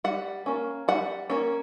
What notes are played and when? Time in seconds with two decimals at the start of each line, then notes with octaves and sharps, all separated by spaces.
0.04 G3 F#5
0.46 A#3 C#4
0.88 G3 F#5
1.30 A#3 C#4